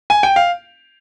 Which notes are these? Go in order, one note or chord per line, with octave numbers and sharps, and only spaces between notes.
G#5
G5
F5